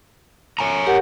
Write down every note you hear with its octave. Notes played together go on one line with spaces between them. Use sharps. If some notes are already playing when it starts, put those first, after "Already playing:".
C#5 G#5 A#5
G4 A#4 F#5